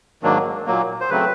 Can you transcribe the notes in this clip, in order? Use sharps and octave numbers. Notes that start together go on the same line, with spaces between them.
G#2 D#3 F#3 A#3 D4
A#2 F#3 A#3
C5
C#3 F#3 A3 C4 B4